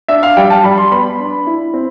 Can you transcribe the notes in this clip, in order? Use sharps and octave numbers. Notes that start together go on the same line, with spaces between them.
D4 E5
F5
G3 G5
A5
G3 B5
C6
B3 B5
D4
E4
C4